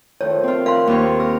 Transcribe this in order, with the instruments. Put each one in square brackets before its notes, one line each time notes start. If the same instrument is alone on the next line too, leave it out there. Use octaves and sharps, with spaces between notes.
[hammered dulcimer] D#3 F3 A3 [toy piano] C#5
[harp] C4 F4
[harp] A#4 [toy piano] F5 C6
[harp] D#2 F4 C#5 [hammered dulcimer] A#3 C4
[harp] A#4